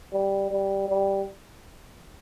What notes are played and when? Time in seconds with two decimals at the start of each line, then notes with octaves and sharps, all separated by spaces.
0.12 G3
0.51 G3
0.88 G3